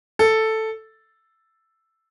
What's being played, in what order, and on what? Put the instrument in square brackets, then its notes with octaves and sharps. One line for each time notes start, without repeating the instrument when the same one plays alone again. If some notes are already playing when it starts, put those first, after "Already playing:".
[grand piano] A4